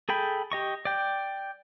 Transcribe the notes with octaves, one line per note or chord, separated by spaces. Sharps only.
G#4 A4 G5 B5
G4 D#5 C#6
D5 G5